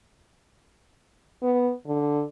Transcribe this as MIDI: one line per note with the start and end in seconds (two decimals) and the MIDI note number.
1.42 1.72 59
1.87 2.23 50